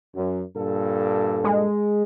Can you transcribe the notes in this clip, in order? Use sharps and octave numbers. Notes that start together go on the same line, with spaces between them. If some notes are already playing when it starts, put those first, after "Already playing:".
F#2
G2 A#2 A4
G#3